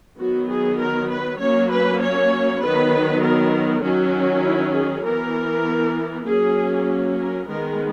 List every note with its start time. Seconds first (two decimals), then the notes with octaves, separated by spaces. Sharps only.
0.19 D#3 F#3 B3 F#4
0.49 G#4
0.79 A#4
1.10 B4
1.40 F#3 A#3 C#4 C#5
1.71 B4
2.01 C#5
2.61 D#3 F#3 B3 B4
3.22 A#4
3.83 D#3 F#3 C#4 F#4
4.44 E4
4.74 G#4
5.04 E3 B3 A#4
6.25 F#3 A#3 C#4 G#4
7.17 A#4
7.47 D#3 G#3 B3 A#4